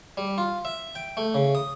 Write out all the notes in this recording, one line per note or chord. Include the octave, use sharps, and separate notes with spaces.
G3
F4
E5
G5
A3
C#3
D#6